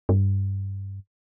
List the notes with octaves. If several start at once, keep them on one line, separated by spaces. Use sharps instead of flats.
G2